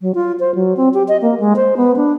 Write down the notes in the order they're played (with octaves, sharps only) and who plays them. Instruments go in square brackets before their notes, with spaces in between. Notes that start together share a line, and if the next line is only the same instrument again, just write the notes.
[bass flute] F#3
F4
C5
F#3
C4
G4
D#5
A#3
G#3
C5
B3
D4